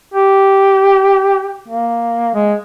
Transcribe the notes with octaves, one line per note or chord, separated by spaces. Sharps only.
G4
A#3
G#3